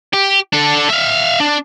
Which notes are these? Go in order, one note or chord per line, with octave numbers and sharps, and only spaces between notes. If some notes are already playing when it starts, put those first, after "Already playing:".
G4
D4 A4
E5 F5
D4